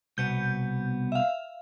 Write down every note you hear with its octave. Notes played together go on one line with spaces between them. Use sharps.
C2 B2 B3 G6
E5 F5